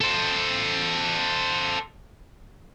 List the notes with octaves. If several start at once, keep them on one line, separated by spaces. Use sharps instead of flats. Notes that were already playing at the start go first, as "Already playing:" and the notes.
A4 C5